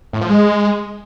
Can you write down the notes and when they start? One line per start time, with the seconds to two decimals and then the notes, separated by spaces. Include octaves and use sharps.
0.13 A2
0.21 F3
0.30 G#3